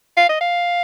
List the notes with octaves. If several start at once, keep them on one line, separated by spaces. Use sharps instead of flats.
F5
D#5
F5